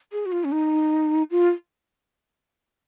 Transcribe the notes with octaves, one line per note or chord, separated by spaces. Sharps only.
G#4
F#4
F4
C#4
D#4
F4